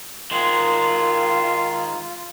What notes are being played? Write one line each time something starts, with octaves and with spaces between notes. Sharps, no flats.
D#3 G#3 F4 C6